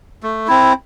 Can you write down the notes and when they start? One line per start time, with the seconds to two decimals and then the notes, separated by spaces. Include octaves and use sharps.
0.23 A3
0.48 C4 E4